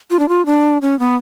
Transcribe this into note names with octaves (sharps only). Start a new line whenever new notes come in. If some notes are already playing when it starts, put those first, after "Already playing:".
F4
D4
F4
D4
C#4
B3